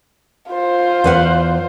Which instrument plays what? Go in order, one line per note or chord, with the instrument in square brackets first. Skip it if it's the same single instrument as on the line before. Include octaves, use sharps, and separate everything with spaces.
[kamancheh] F4 C5
[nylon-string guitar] E2 B4 F#5